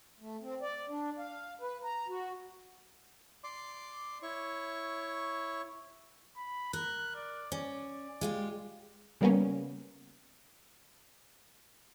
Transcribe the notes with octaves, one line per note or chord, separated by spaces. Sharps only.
A3
C4
D5
D4
F5
B4
A#5
F#4
D5 C6 D6
E4 C#5 C#6
B5
A#4 F#6
D5
C#4 D5
G#3 F4 G4
C#3 G3 A#3 B3 C#4